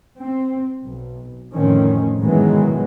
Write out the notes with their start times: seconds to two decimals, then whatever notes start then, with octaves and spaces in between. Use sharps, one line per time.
0.20 C4
0.86 B1
1.53 F2 A2 D3 D#3 C4 C#4
2.18 G#2 B2 D#3 E3 F#3 G#3